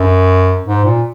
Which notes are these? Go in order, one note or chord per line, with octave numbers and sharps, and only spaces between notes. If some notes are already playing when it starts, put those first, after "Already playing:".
Already playing: F#2
G#2
A#2